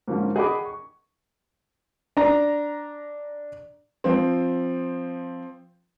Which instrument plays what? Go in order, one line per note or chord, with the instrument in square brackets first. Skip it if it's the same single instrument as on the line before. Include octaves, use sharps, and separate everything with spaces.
[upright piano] G#2 D3 F3 A#3 C#4
G#4 D#5 F#5 G5 B5 D6
C#6
[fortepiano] D4 A#5
[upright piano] F3 C4